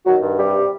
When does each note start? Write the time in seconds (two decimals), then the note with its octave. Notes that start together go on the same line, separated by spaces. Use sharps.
0.05 D#3 F#3 F#4
0.22 G2
0.37 C3 G3 G4